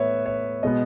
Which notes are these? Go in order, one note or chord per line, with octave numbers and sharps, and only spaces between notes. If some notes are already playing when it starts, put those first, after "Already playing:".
Already playing: A2 B3 B4 C#5 E5
C#5
B2 G#3 B3 D#5